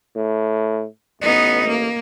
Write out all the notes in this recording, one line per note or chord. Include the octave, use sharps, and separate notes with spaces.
A2
A1 B3 D#4
A#3